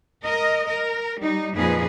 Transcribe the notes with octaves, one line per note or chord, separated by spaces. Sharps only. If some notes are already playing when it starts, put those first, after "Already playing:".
A#4 D#5
A#4
G3 D#4
F2 A#2 F3 D#4 G#4 B4